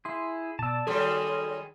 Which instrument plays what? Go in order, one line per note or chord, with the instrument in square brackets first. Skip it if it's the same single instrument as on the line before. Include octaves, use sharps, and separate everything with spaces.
[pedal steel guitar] E4 G#4 [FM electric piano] C6
[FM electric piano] B2 E6 [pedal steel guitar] D5 A5
[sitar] D#3 F#3 G3 [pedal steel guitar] G#4 C6 [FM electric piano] A4